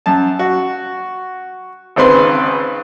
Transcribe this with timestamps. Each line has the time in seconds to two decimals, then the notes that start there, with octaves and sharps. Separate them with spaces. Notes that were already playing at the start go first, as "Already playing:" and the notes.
0.06 F#2 A5
0.39 F#4
1.96 G#1 C#2 C4 B4 C6